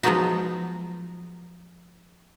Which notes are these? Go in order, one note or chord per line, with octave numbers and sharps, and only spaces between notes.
F3 F#3 G#3 B3 D#4 F#4